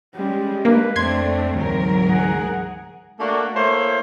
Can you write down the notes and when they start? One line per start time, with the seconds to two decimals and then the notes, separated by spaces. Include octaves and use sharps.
0.15 G3 G#3 C#4
0.65 A#3 D4 B4
0.96 F2 A3 C4 D4 C6 G#6
1.55 D2 G#2 E3 F#3 A3 A#4
2.08 G#4 F#5
3.20 A3 A#3 D4 F#4
3.55 A3 A#3 E4 C5 C#5